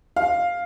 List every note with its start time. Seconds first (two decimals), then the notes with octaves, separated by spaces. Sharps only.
0.16 F5